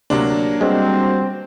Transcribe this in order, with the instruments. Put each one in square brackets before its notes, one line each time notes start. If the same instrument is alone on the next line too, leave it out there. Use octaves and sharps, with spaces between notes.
[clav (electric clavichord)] D2 C3 [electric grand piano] F#3 A#3 D4
[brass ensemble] G3 F#4 C5 [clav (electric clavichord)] G#3 B3 [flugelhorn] C4